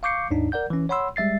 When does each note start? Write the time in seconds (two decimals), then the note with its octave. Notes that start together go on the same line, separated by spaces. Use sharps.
0.03 F5 C#6 D6 G6 C7 C#7
0.31 D#2 G#2 D4 D#4
0.52 A#4 D5 F#5 G6
0.70 E3 C#4
0.89 C#5 F#5 B5 C6 E6
1.16 G3 G#3 E5 A6 C7